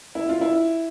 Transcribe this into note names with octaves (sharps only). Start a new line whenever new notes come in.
E4
F4
E4